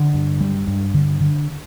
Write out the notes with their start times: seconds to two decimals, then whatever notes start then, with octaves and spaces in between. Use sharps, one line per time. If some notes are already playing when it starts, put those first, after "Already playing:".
Already playing: D3
0.14 G2
0.41 G3
0.67 G2
0.94 D3
1.21 D3